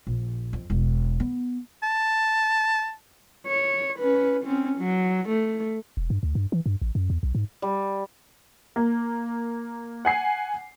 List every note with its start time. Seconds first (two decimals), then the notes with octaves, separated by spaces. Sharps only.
0.07 A#1
0.53 F2
0.70 E1
1.20 B3
1.83 A5
3.47 C#5
3.99 C#4 B4
4.45 C4 C#4
4.79 F#3
5.29 A3
5.97 E1
6.10 G2
6.23 D2
6.35 G2
6.52 E3
6.66 G2
6.82 A1
6.95 F#2
7.10 E2
7.23 B1
7.35 G#2
7.62 G3
8.76 A#3
10.05 F#5 G#5 C7